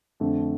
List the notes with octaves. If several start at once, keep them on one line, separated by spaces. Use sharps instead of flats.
F2 D3 A3